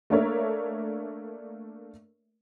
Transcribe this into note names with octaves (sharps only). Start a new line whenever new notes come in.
A3 A#3 D4 A#4 C#5 E5